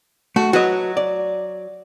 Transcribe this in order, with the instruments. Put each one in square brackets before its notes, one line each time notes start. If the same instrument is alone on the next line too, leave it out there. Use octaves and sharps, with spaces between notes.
[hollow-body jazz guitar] A3 [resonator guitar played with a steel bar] F#4
[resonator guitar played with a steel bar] F#3 [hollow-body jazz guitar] F#4 B4 D#5
[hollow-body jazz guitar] D5